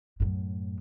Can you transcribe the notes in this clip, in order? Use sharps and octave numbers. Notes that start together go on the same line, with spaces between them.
F#2 A2